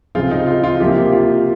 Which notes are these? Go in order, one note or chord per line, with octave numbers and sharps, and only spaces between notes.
C#3 F3 C4 F4
D#4
F4
F4
C3 F3 A#3 G4
F4